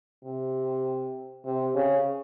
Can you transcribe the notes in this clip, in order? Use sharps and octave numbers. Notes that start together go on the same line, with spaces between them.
C3
C3
C#3